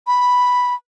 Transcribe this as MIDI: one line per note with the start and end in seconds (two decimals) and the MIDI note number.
0.07 0.74 83